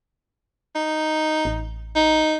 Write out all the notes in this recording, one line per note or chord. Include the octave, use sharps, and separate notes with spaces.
D#4
A1
D#4